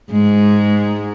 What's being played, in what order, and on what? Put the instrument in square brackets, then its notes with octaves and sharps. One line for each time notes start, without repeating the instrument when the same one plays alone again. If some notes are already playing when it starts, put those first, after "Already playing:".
[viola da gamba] G#2 G#3